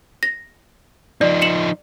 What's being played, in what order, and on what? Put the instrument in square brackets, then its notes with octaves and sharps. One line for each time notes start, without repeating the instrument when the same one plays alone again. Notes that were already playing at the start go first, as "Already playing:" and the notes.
[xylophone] A#6
[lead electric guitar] F3 D#4 [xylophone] D5
[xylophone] C#7 E7 F#7